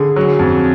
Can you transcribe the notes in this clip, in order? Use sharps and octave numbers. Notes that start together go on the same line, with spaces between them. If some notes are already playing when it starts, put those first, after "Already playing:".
Already playing: D3 G#4
F#3
F2